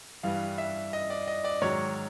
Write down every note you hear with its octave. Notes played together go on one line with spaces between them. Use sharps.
G2 E3 G3 F5
E5
D#5
D5
D#5
D5
G#2 D#3 F#3 C#5